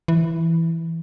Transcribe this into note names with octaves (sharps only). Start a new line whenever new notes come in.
E3